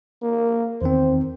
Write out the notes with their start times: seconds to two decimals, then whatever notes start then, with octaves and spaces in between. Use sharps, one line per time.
0.22 A#3
0.82 E2 D#3 C4 C5